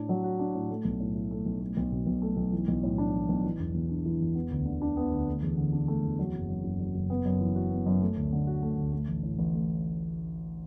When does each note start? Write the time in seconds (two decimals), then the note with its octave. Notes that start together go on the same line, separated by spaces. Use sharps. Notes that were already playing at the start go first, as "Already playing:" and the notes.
Already playing: A2 D4
0.09 F#3
0.24 F#4
0.39 D4
0.55 A2
0.70 A3
0.85 B1
1.00 A2
1.15 E4
1.31 A3
1.46 B1
1.61 A3
1.77 B1
1.92 B2
2.07 B1
2.22 A3
2.37 B1
2.52 E3
2.68 B1
2.83 A2
2.98 D4
3.13 E3
3.29 B1
3.44 E3
3.59 E1
3.74 E2
3.89 D4
4.05 E3
4.21 E1
4.35 B3
4.51 D2
4.66 D3
4.82 D4
4.97 B3
5.11 D2
5.27 A3
5.43 E2
5.57 D3
5.73 D4
5.88 A3
6.04 E2
6.19 F#3
6.34 F#1
6.48 F#2
6.64 F#1
6.80 F#3
6.95 F#1
7.10 B3
7.25 F#2
7.41 E3
7.56 F#4
7.70 B3
7.86 F#2
8.01 A3
8.17 D2
8.33 D3
8.47 F#4
8.63 A3
8.78 D2
8.93 A3
9.08 A1
9.23 A2
9.39 A1
9.54 A3